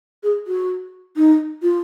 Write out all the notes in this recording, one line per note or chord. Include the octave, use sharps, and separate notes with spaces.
G#4
F#4
D#4
F4